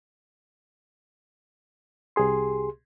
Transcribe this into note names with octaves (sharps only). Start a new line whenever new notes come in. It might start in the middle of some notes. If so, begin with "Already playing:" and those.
C2 G4 G#4 C6